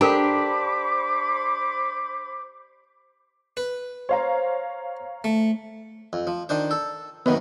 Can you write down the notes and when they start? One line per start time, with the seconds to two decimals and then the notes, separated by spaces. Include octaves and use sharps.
0.01 D4 G4 A4 A#4 C5 A#5 B5 D6
3.57 B4
4.09 C5 C#5 F5 A#5
5.24 A3
6.13 F2
6.27 F3
6.49 D#3 D4 C5
6.71 A4
7.26 F#2 B2 D#3 B3